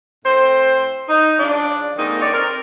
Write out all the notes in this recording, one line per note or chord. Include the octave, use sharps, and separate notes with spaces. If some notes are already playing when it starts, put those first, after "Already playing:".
A2 C4 C5
D#4
C#3 F3 D4
F2 G#2 D#3 A#3 D#4
D3 D#3 C#5 D5
C4 A#4